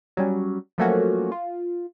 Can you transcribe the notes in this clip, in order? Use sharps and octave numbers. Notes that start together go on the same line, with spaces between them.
F#3 G3 C#4
F3 F#3 A3 A#3 C#4 F#4
F4